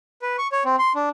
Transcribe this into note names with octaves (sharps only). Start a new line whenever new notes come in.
B4
C#6
C#5
C4
C6
D4